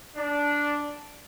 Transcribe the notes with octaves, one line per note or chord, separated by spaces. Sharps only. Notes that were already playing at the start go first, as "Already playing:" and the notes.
D4